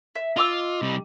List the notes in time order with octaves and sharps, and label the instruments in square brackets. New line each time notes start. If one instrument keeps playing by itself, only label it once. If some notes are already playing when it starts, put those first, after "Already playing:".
[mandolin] E5
[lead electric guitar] F4 [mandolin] D#5 D6 E6
[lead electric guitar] C3 G3